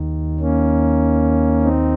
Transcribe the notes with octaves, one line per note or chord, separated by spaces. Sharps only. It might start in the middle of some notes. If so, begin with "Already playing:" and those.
Already playing: D#2 D#3
A#3 C#4
C4 D#4